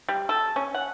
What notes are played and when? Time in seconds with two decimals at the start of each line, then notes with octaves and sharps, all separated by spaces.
0.08 G3
0.29 A4
0.56 C#4
0.74 F#5